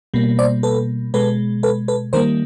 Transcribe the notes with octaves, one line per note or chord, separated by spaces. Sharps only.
B2 G3 A#3
C5 D5
A4 B4
B2 G#3 A4 B4
A4 B4
A4 B4
D#3 G3 A#3 A#4 C5